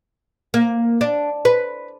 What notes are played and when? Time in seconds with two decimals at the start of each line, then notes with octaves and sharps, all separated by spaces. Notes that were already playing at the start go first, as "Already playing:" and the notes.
0.54 A#3
1.01 D4
1.45 B4